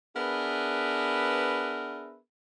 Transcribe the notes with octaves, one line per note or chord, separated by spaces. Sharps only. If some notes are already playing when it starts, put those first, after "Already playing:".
B3 D4 G#4 A#4 B4 E5